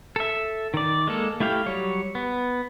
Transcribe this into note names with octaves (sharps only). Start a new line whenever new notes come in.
A4 E5
D#3 D5
G#3 A#3 A4
A3 E4 G4 F5 G5
F#3 G3 C#5
B3